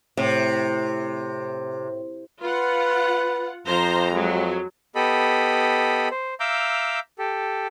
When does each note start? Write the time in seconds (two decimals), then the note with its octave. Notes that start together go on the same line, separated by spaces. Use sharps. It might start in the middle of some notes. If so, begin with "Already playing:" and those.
0.17 A2 C3
2.43 F4 B4 F#5
3.67 F2 F3 C5 A#5
4.14 F#3 G#3
4.95 B3 G4 A4 D#5 B5
6.11 C5
6.40 E5 F5 A#5 D6 E6 G6
7.19 G4 A4